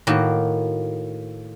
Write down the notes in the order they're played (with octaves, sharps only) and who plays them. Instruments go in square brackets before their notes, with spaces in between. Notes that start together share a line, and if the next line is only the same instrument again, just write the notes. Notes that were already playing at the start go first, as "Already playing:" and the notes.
[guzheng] A2 D#3 A#3 F#4